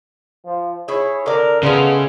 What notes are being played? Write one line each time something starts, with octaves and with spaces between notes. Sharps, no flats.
F3
E4 G#4 C#5
D3 A#4 D5
C#3 G#3 A3 B3 E4